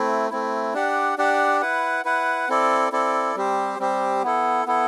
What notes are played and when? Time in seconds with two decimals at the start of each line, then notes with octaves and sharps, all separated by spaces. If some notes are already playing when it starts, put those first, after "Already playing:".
Already playing: A3 C4 E4
0.30 A3 C4 E4
0.74 D4 G4 D5 F#5
1.18 D4 G4 D5 F#5
1.61 E4 B4 F#5
2.05 E4 B4 F#5
2.49 C4 E4 A4 D5
2.92 C4 E4 A4 D5
3.36 G3 C4 G4 C5
3.79 G3 C4 G4 C5
4.23 B3 E4 A4
4.66 B3 E4 A4